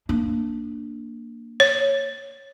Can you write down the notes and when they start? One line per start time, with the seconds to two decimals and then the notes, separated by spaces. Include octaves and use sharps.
0.09 A#3 D4
1.60 C#5